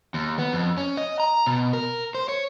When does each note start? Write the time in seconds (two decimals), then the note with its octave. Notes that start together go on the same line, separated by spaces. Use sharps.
0.14 D#2
0.39 B3
0.53 F2
0.78 C#4
0.97 D#5
1.20 A#5
1.46 B2
1.73 A#4
2.15 C5
2.29 C#5